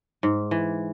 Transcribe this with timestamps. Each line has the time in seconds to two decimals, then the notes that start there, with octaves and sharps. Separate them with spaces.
0.23 G#2
0.51 E3